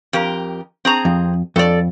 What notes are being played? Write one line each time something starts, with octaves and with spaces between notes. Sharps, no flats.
F2 G4 A#4
C4 G#4 A#5
F2
F2 A4 D5